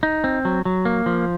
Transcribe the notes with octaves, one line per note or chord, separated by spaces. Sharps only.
D#4
C4
F#3
F#3
A#3
F3